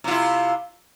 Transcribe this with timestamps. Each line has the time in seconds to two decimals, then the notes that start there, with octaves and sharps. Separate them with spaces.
0.04 C3
0.08 F4
0.11 E4